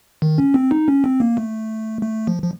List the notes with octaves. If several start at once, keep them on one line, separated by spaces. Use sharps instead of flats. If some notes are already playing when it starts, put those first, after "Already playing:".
D#3
C#4
C4
D#4
C#4
C4
A#3
A3
A3
F3
F3